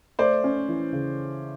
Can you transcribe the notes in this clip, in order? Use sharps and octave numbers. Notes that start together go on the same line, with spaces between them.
A3 C5 D5
C#4
E3
C#3